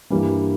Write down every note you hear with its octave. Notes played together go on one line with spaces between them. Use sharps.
G2 E3 G3 A#3